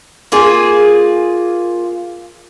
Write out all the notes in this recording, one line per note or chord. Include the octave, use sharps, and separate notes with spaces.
A#3 F4 G#4